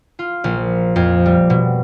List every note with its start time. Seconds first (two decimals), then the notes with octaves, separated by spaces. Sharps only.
0.19 F4
0.44 A#1
0.96 F2
1.26 G3
1.50 B2